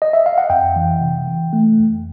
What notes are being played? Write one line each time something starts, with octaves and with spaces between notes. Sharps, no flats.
D#5
E5
F5
F#5
F2 G5
E3
C3
E3
A3
F2